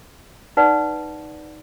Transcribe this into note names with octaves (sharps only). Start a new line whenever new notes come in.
D#4 B4 D5 F#5